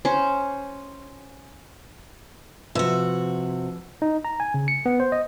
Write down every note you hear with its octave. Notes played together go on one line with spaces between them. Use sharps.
C#4 C5
C3 F3 F#4 B4 E6
D#4
A#5
G#5
C#3
C#7
B3
C5
D#5